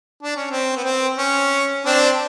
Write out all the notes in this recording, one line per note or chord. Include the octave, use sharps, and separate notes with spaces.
D4
C#4
C4
B3
C4
C#4
C4 D4